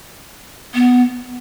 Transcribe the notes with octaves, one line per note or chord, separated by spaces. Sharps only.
B3